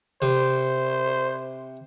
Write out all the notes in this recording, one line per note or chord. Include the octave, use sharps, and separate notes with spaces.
C3 C5